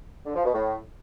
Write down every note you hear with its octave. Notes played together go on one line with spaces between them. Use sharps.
D3
F3
B2
A2